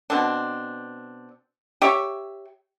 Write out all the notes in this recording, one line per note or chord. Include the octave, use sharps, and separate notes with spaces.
B2 C4 D4
G4 C#5 E5